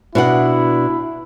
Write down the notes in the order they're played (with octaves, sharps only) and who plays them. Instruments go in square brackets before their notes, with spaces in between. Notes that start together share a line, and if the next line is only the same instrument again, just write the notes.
[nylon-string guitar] B2 D4 F#5 [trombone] E4